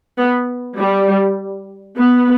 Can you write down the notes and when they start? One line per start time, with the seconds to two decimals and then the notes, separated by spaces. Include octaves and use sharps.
0.18 B3
0.78 G3
1.98 B3